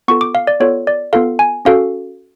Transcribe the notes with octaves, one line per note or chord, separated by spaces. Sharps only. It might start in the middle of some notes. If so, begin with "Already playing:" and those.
B3 F4 A4 C#6
D6
F5
D5
B3 F4 A4 C#5
D5
B3 F4 A4 F5
G#5
C#4 F#4 A4 F5